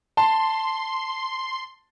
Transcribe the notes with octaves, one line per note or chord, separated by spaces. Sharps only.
A5 C6